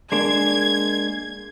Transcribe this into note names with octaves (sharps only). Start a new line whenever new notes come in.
G#3 A#3 D4 G#6